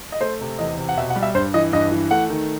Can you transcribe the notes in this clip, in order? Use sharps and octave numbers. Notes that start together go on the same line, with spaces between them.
D#5
A3 C5
C3
E2 D#5
C3
F#5
B2 E5
F#5
G3
E5
G2 C5
E3 D#5
G2 D#5
E3
A3 F#5
D#3